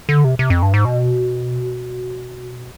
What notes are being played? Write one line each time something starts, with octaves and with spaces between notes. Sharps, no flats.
D3
C3
C3
F2
G2
G#2
B2